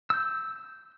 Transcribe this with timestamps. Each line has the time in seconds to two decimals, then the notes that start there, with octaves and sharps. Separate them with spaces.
0.10 E6 G6